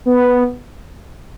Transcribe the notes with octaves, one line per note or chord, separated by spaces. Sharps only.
B3